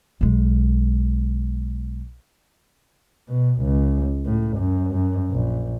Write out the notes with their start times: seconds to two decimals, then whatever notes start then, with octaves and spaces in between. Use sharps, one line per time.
0.21 B1 G#3
3.29 B2
3.61 C#2
4.26 A2
4.57 F#2
4.93 F#2
5.31 A#1